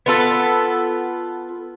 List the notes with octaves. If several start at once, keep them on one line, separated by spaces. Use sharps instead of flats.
B3 F4 A4